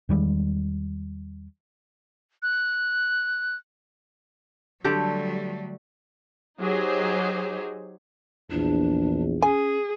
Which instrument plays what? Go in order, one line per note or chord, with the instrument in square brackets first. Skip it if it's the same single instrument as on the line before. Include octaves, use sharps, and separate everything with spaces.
[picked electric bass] E2 D#3 G3 G#3
[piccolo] F#6
[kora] D3 A3 G4 [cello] F#3 G3
[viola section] F#3 D#4 G4 G#4 C5
[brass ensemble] A#1 E2 [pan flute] D4
[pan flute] C#4 [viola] G#4 [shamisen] G#5